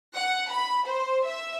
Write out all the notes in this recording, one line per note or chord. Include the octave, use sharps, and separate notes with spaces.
F#5
B5
C5
E5